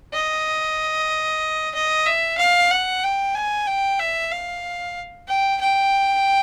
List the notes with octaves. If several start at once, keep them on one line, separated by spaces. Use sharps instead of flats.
D#5
D#5
E5
F5
F#5
G5
G#5
G5
E5
F5
G5
G5